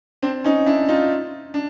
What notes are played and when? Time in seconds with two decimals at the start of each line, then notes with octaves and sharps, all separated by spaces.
0.22 C4 D4
0.44 C#4 D#4
0.66 D4 E4
0.89 D#4 F4
1.54 D4